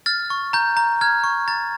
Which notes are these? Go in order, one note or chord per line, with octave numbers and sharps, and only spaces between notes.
F6 A6
C#6
A#5 G6
A#5
F6 G#6
C#6
A#5 A6